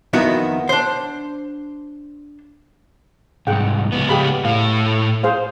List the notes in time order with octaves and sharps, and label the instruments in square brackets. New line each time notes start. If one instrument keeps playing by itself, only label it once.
[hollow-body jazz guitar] F2 D#3 B3 E4 F#4 A#5
D4 C5
[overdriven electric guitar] C2 G#2 [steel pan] G#4 F#5 G5
[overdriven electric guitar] C#2 B3
[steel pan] G4 G#4 B5
[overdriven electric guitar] A2 A3 [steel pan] F5
[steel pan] G#4 C5 F5